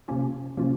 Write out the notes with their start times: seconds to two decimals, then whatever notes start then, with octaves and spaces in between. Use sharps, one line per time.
0.08 C3 F3 A#3 C#4 F4
0.57 C3 F3 A#3 C#4 F4